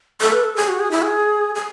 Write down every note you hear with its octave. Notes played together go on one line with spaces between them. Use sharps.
A4
B4
A4
G#4
F#4
G#4
E4
G#4
G#4